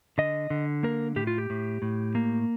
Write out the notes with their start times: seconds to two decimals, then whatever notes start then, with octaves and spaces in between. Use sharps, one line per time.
0.18 D3 D#5
0.50 D3
0.83 A#3 A#4
1.16 A2 G4
1.27 F4
1.38 G4
1.50 A2
1.82 A2
2.15 A#3